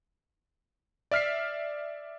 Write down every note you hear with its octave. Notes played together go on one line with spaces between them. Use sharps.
D5 E5 F6 B6 C7